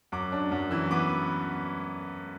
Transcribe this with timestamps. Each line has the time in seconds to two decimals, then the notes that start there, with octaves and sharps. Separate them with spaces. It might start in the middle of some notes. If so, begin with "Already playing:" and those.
0.12 F#2 D6
0.32 D4
0.52 F#2
0.71 E3 E6
0.91 B3 D6